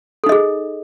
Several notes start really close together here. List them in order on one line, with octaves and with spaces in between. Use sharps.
A4 D#4 D#5 G#4